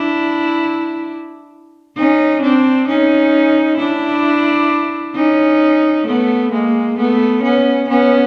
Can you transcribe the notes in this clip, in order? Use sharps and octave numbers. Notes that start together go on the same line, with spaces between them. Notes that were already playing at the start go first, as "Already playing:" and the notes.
Already playing: D4 E4
C#4 D#4
C4 D4
C#4 D#4
D4 E4
C#4 D#4
A3 B3
G#3 A#3
A3 B3
B3 C#4
B3 C#4